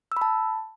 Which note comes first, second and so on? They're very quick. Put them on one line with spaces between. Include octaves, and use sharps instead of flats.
E6 B5 A5